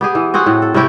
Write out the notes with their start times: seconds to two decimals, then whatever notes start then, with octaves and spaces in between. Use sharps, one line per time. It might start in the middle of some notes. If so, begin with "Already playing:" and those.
0.01 B3 G4 G#4
0.15 E3
0.34 C4 F#4 G#4 F#5
0.46 A2
0.62 A4
0.74 C3 C#4 E4 G4